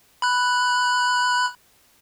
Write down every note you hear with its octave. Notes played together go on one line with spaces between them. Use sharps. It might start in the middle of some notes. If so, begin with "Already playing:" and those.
B5 F#6